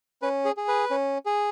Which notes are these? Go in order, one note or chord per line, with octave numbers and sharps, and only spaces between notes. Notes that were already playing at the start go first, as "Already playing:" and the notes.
C#4 B4
G#4
G#4
B4
C#4
G#4